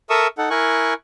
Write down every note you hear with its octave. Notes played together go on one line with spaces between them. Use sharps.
A4 A#4 E5 C#6 D#6 E6
D#4 A4 F#5
E4 A#4 G#5 C#6 F#6